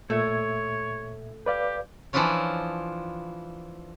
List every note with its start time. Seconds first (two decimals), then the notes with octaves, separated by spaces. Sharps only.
0.10 A#2 A3 C#5 E5 G#6
1.46 G4 B4 D5 F5
2.13 E3 F3 D4 E4 F4 C#5